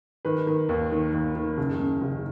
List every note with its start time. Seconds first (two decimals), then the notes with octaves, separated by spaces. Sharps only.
0.25 D#3 B4
0.47 D#3
0.69 D#2
0.92 D#3
1.14 D#2
1.36 D#3
1.58 F#1
1.80 C#3
2.02 F#1